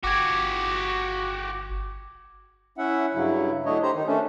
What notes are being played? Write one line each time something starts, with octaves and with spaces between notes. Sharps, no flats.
G1 F#4 G4 D6 G#6
C#4 E4 E5 F#5
G2 C#3 F#3 E4
F#3 A3 D4 E4 C#5 D#5
G4 C5 A#5
D#3 D#4
A3 C#4 D4